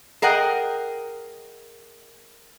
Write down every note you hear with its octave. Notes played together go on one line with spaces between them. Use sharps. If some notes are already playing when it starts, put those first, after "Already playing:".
G#4 A#4 D#5 F#5 G5